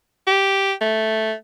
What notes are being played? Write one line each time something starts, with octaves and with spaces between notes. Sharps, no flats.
G4
A3